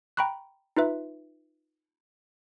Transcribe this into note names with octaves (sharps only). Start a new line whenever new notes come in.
G5 A#5 B5 C#6 F#6
D#4 F4 B4 E5